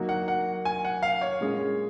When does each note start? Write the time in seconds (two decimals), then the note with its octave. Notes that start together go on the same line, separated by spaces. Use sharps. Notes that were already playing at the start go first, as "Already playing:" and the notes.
Already playing: F#3 A#3 D#4 F#4
0.09 F#5
0.28 F#5
0.65 G#5
0.85 F#5
1.03 F5
1.21 C#5
1.41 A#2 G#3 C#4 G#4